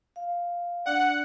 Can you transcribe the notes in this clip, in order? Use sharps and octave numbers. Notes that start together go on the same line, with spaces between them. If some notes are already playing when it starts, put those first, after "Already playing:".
F5
D4 D5 F#5